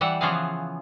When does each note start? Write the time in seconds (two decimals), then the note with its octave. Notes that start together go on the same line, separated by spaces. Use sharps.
0.01 E3 G3 E5 F#5
0.21 C#3 E3 F3 B3 G#4 F5